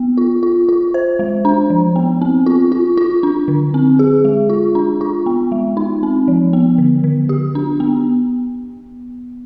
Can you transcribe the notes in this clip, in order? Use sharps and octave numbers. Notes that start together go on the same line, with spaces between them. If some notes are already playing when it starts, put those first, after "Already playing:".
Already playing: B3
F4
F4
F4
C5
G#3
D4
F3
B3
C4
F4
F4
F4
D4
D3
C4
G#4
G#3
F4
D4
F4
B3
G#3
D#4
C4
F3
B3
D3
D3
G4
D4
B3